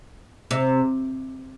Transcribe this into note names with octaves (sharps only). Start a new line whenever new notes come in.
C3